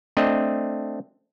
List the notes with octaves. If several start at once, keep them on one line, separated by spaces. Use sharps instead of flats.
A3 C4 D4 D#5